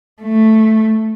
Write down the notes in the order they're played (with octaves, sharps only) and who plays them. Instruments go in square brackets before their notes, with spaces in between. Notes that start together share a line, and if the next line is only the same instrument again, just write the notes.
[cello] A3